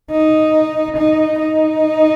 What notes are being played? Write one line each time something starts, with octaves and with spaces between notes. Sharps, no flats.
D#4
D#4
D#4